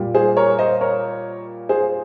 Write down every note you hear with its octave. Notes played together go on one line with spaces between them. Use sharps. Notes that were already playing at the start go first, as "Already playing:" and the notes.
Already playing: A#2 G3
G#4 C5
A#4 C#5
C5 D#5
A#4 C#5
G#4 C5